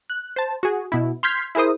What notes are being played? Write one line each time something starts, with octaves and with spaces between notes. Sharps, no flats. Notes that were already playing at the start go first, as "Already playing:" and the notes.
F#6
C5 A5
F#4 G#4
B2 E4
C6 F6 G6 G#6 B6 C7
E4 G#4 A#4 C5 D#6